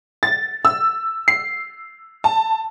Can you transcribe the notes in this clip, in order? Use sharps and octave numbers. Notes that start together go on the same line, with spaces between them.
A6
E6
C7
A5